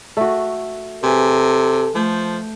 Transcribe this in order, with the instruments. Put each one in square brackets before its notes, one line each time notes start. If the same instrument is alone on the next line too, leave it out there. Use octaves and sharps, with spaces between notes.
[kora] A3 F#4
[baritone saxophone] C3 [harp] G#4 B4 G#5 [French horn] A4
[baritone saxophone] F3 [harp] A3 G6